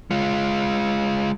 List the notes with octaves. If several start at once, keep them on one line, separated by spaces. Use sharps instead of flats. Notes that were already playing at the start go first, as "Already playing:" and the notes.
G#3 F4